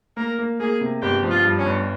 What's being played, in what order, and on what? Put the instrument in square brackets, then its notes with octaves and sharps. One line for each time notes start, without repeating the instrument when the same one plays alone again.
[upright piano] A#3 [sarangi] A#4
[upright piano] A#3
[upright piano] A#3 [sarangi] G#4
[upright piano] C3
[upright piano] G1 [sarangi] G4
[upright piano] F3
[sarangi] F4
[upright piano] G2
[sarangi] C#4
[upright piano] G1